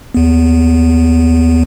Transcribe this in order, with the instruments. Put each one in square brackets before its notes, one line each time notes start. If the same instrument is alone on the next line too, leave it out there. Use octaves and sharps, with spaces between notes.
[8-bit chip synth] D#2 B3